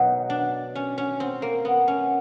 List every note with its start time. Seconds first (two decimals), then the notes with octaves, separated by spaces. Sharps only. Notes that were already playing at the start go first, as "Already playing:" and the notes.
Already playing: B2 F#3 D#4
0.30 D4
0.75 C#4
0.98 C#4
1.20 C4
1.42 A#3
1.65 B3
1.88 C#4